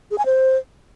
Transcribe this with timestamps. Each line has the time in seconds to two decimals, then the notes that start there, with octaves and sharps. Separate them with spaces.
0.11 G#4
0.18 G#5
0.26 C5